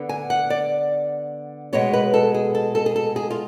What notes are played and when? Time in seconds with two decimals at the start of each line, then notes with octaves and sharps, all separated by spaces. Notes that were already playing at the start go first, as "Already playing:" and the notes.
Already playing: D3 B3
0.09 G#5
0.30 F#5
0.50 D5
1.73 B2 G#3 B3 C#5
1.93 B4
2.14 A4
2.34 G#4
2.55 A4
2.75 A4
2.86 G#4
2.96 A4
3.16 G#4
3.30 F4